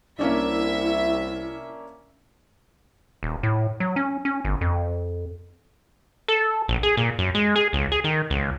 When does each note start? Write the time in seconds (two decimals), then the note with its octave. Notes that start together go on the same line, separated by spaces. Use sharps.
0.19 C2 A#3 C#4 D4 E4 E5
3.23 D#1
3.43 A2
3.80 F#3
3.96 C#4
4.25 C#4
4.45 G1
4.61 F2
6.28 A4
6.68 A#1
6.83 G#4
6.97 A#2
7.18 F#2
7.35 G#3
7.56 G#4
7.73 C#2
7.92 G#4
8.04 D#3
8.30 C#2